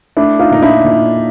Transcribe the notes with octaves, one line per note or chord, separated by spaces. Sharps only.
A3 D4 E4
D#4 F4
A#2 D#4
D4 E4
A#2